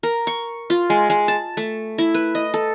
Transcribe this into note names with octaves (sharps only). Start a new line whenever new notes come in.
A#4
C#6
F4
G#3
G#3
A5
A3
E4
B4
D#5
A4